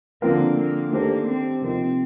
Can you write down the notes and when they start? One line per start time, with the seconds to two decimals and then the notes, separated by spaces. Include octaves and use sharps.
0.21 D3 F3 A#3 C4 F4 A#4
0.57 A#3
0.91 D#3 A3 A#3 D4 G4 C5
1.27 C4
1.61 C3 F3 A#3 C4 D#4